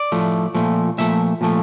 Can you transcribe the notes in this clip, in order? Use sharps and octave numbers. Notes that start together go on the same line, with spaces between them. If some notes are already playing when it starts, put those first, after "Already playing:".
Already playing: D5
A2 F3 A3
A#2 F3 A3
A#2 F3 A3 E5
A#2 F3 A3